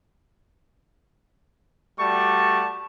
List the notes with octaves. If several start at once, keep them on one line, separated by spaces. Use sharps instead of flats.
G3 A3 F#4 D5 A5 C#6